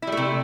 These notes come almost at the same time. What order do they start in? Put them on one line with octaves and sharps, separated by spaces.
E4 G3 A3 C3